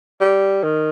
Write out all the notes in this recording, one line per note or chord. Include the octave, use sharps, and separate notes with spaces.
G3
D#3